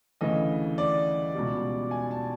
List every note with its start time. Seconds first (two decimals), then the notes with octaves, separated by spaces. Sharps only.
0.21 D2 C#3 E3 A3 D#5
0.78 D5
1.34 C#2 B2 G3
1.91 G#5
2.11 A5